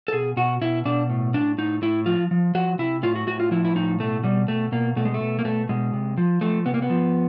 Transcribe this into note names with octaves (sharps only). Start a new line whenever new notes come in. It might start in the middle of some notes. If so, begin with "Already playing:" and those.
A4
B2 G#4
B2 F#4
B2 E4
B2 D4
A2
A2 D4
A2 D#4
A2 E4
F3 F4
F3
F3 F#4
C3 E4
A2 F4
F#4
A2 F#4
F4
F3 E4
E4
A2 D#4
B2 A3
B2 G3
B2 A3
B2 A#3
B2 A3
G#3
A3
B2
A#3
B2 A3
B2 G#3
C3
F3
F3 A3
C3 B3
A#3
B3
F3